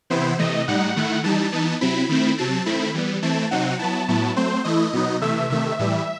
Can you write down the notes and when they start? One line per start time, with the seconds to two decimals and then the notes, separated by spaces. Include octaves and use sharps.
0.10 C3 E3 B3 E4 C5
0.38 C3 E3 A3 D#5
0.68 A2 G3 D#4 F#5
0.96 D#3 A3 E4
1.24 E3 G3 D#4 A5
1.52 E3 B3 D#4
1.81 C3 F#3 C4 E4 B5
2.09 D#3 A3 C4 E4
2.38 C3 F#3 C4 A5
2.66 D#3 A3 C4 E4 B5
2.94 E3 G3 B3
3.22 E3 A3 C4 E4 A5
3.51 C3 F#3 C4 D#4 F#5
3.79 F#3 B3 E4 A5
4.08 A2 F#3 B3 E4
4.36 F#3 A3 C4 C5
4.64 E3 A3 E4 D#5
4.93 B2 F#3 B3 D#4
5.21 C3 E3 A3 E5
5.50 C3 D#3 A3 E5
5.79 A2 E3 G3